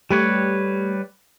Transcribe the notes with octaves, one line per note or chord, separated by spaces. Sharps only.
G3 A3 G4 B4 C#5